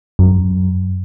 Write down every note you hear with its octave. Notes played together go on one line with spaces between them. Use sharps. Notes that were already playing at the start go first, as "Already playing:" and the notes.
F#2